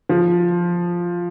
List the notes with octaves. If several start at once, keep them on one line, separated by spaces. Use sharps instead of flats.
F3